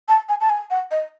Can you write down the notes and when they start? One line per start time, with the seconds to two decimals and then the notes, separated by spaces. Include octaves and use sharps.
0.09 A5
0.29 G#5
0.41 A5
0.50 G#5
0.71 F#5
0.91 D#5